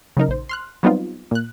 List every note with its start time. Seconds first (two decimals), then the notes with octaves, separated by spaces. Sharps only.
0.17 C#3 F#3 D#4 A#4
0.29 A#1 C5
0.49 C6 F6 F#6
0.83 F#3 G3 B3 C4 D#4 F4
1.31 A#2 F#6